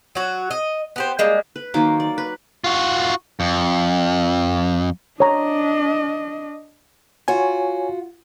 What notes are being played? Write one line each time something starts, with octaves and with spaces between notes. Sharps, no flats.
F#3 F#4
D#5
B3 G4 C5
G3 G#3 A#3
B4
D#3 F#3 A#3 D6
D5
B4
F4 F#4
F2
D4 C#5 D#5 A#5
F4 F#4 C#5 G#5